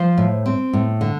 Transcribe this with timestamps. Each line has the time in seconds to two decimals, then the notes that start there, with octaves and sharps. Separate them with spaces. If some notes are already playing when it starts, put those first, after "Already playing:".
Already playing: F3 C5
0.18 A2
0.46 C4
0.73 A2
1.01 D3